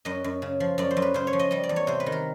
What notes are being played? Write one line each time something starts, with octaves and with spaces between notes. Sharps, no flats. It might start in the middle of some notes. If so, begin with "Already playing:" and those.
F#2 D#5
F#2
C#3
F3
F#2 D5
C5
F#2
B4
C#3 C5
C#5
F3
D#5
G3 D#5
D5
E2
C#5
C3 C5
B4
D#3
A#4